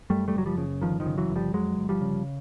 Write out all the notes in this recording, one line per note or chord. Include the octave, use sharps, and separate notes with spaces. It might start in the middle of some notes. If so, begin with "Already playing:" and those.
F#2 G3 A3
G3 A3
F#1 F#3
F3 G3
C#3
G1 D#3 F3
D#3 F3
C#3
E3 F#3
G1
F3 G3
F2 F#3 G#3
G1
F3 G3
C#3